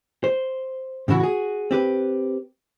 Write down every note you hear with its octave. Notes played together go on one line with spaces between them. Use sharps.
C5
A2 C#3 E3 E4 F#4
F#4 G#4
C4 G4 B4